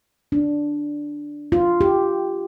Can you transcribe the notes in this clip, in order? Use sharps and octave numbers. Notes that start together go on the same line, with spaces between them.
D4
F4
G4